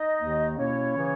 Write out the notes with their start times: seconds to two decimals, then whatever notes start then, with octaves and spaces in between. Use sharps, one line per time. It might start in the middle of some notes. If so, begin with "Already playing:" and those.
Already playing: D#4 D#5
0.20 D#2 D#3 A#3
0.58 B2 A#3 C#4 E4 C#5
0.96 C#3 E3